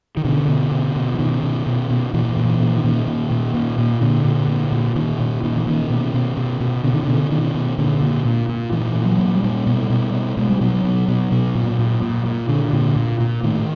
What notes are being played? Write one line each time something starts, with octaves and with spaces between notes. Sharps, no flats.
D#3
B2 D3
B2
B2
B2
E3
B2 D#3
B2
B2
B2
A#2 E3
A#2
E3
A#2
D#3
A#2
A#2
A#2
A#2
A#2
A#2 D3
A#2
A#2
A#2
A#2 D#3
A#2
A#2 D#3
E3
A#2 D#3
B2
B2
B2
B2
B2 D3
D#3
B2 D3
B2 D#3
B2
A#2 D3
A#2
A#2
A#2
A#2 E3
A#2
F#3
A#2
G3
A#2
B2
B2
B2
B2 G#3
G3
B2 F#3
B2
B2
B2
A#2
A#2
A#2
A#2
A#2 D3
A#2 D3
A#2
A#2
A2 D#3